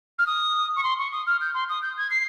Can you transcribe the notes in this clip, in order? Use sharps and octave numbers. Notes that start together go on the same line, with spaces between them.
F6
D#6
C#6
C6
C#6
D#6
F6
G6
C6
D#6
G6
G#6
C7